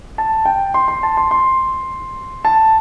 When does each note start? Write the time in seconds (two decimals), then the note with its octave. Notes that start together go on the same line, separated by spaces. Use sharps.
0.18 A5
0.45 G5
0.74 C6
0.88 C6
1.03 A5
1.17 C6
1.31 C6
2.45 A5